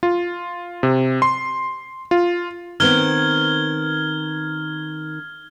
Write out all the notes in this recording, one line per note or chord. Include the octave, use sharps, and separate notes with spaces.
F4
C3
C6
F4
D#3 B3 C4 F6 G#6 G7